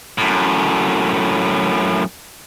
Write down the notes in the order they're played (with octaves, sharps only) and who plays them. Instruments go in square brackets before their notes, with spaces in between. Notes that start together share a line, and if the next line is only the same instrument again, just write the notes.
[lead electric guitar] F#2 A2